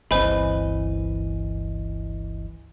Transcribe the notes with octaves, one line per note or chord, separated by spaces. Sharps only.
G1 C#2 E3 C4 C5 D#5 G#5 B5